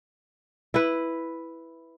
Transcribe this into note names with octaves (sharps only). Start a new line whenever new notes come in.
E4 B4